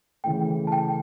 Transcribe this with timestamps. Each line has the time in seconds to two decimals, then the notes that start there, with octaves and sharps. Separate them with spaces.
0.24 C#3 E3 A3 G5
0.67 A5
0.72 G5